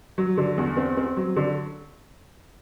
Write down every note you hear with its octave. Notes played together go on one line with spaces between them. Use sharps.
F#3
D3
E2
C4
C4
F#3
D3